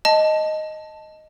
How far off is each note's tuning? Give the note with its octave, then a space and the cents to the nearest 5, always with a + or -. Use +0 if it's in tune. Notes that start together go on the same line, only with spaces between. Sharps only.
D#5 +0 A5 +0